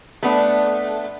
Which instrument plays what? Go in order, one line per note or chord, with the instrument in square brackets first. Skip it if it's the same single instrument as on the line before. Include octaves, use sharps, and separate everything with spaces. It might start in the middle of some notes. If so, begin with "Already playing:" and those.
[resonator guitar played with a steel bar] A3 B3 D4